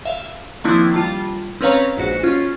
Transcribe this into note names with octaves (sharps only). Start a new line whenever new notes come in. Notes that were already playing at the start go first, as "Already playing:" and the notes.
E5 F5
D#3 F3 A#3 C4 D4 E4
G3 F4 A5
C4 C#4 B4 C#5 F5 A#5
A#1 G#2 F#4 C#7
C#4 F4